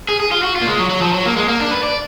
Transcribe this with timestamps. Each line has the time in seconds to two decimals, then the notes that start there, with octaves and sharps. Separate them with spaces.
0.09 G#4
0.20 G#4
0.31 F4
0.43 F#4
0.56 F4
0.61 A#3
0.67 G#3
0.79 F#3
0.90 F#3
1.02 F3
1.13 F#3
1.26 A#3
1.36 G#3
1.48 A#3
1.60 D4
1.71 B4
1.83 D5